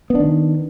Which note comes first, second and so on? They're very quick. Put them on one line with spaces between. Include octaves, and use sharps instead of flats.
B3 D4 D#3